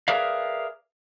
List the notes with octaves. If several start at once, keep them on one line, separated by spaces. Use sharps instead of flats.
G#4 A#4 B4 D5 E5 F5